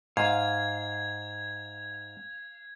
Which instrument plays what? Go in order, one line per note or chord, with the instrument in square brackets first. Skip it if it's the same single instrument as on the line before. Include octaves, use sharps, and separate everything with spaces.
[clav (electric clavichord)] G#2 [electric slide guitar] F5 [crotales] G#6